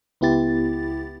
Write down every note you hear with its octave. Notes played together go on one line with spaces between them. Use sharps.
C#2 B3 E4 G4 A6